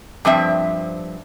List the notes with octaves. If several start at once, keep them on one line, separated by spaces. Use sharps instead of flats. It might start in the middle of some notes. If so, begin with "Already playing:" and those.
G2 F3 C4 E5